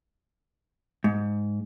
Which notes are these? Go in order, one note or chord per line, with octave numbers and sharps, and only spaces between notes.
G#2